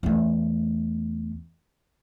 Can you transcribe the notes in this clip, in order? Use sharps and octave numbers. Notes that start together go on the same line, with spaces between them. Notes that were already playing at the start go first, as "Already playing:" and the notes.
E2 A3